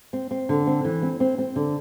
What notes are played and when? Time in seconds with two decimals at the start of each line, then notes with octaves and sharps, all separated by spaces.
0.13 C4
0.31 C4
0.49 D3
0.67 C4
0.85 E3
1.02 C4
1.20 C4
1.38 C4
1.56 D3